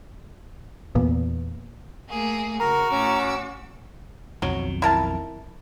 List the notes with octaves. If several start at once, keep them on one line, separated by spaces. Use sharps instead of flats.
E2 A#2 B3
A3 A#3 G#4
C#3 F#4 A#4 A#5
A2 C#4 D6 E6
B1 F2 D#3 F#3
E4 A#4 A5